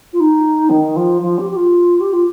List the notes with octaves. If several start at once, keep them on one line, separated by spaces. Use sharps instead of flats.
F4
D#4
D#3
F3
F3
G4
G4
F4
G4
F4